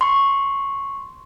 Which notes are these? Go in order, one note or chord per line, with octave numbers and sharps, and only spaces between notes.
C6 C#6